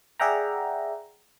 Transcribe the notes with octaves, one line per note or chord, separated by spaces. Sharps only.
G#4 D5 E5 F#5 G5 A#5